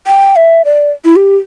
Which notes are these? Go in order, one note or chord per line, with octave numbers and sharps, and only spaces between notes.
G5
E5
D5
E4
G4